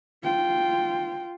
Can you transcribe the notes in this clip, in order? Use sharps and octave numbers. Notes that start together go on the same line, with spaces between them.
F4 G5